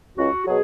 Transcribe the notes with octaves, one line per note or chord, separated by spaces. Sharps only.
C#2 F#4
B2 F#3 G#4